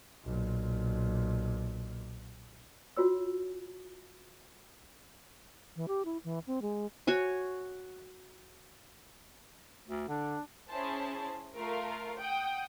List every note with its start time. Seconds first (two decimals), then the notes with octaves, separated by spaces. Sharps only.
0.24 B1 A#2
2.97 F4 F#4 C#5 E6
5.76 E3
5.88 G4
6.05 E4
6.24 E3
6.47 C4
6.62 G#3
7.07 F#4 C#5 G#5
9.88 D2
10.08 D3 D4
10.70 C#4 E4 G#4 C5 A5
11.56 A3 F4 A#4 F5
12.18 F#5 G5 D#6 G6